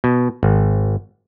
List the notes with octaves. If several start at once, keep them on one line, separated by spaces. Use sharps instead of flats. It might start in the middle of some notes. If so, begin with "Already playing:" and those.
B2
G#1